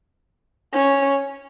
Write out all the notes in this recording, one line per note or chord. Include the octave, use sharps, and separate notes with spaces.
C#4